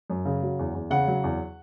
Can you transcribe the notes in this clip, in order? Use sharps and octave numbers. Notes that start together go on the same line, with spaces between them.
F#2
C#3
F#3
E2
E2
C#3 F#5
F#3
E2